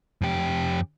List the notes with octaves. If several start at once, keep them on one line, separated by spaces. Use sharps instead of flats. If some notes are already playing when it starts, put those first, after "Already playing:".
F2 G4